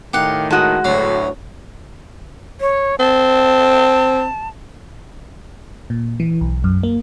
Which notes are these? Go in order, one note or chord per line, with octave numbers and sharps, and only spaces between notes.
A2 D#3 G4 F5 F#5
G#3 F#4 A4 D#6
D2 A2 F#3 C6
C#5
C4 A5
A#2
E3
B1
F#2
A#3